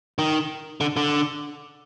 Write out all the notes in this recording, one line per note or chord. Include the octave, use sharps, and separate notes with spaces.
D#3
D3
D3